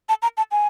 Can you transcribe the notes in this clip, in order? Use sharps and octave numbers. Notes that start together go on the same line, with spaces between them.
A5
A#5
A5
G#5